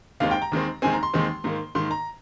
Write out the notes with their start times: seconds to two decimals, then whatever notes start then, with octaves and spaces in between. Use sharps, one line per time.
0.20 D#2 D#3 G#3 C4 F5
0.31 G5
0.42 A#5
0.52 D#2 D#3 G#3 C4
0.82 D#2 D#3 G#3 C4 G#5
0.93 A#5
1.03 C6
1.14 D#2 D#3 G#3 C4
1.44 G#2 D#3 A#3
1.75 G#2 D#3 A#3 C6
1.91 A#5